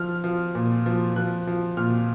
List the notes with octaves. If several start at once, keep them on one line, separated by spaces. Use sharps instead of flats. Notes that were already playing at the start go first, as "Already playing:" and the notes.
Already playing: F3 F6
F3
A#2
F3
F3 F#6
F3
A#2 F6